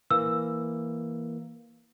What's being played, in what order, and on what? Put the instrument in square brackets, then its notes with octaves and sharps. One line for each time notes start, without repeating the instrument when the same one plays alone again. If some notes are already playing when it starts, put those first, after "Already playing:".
[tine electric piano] E3 A#3 [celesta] E6